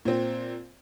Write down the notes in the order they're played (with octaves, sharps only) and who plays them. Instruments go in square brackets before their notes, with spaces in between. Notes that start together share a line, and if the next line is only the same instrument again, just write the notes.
[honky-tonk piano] A#2 C4